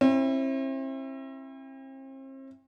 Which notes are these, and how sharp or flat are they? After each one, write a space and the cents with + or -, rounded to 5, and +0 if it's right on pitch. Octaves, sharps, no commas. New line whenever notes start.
C4 +40 E4 +0